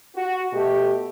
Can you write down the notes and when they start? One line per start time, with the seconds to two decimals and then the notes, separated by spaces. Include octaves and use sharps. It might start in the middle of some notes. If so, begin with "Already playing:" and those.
0.15 F#4
0.53 B2 A3 G4